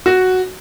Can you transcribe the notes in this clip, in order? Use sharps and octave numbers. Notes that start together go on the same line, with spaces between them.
F#4